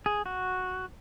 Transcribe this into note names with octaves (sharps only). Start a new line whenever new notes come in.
G#4
F#4